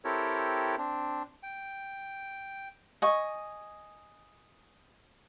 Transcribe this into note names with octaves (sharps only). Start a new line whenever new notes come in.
C4 E4 G4 A4 A#4 C#5
C4 D4
G5
D#5 G#5 C#6